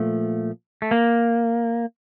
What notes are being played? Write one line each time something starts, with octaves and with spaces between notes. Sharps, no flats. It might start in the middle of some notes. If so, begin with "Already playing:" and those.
Already playing: A#2 F3 A3
A3
A#3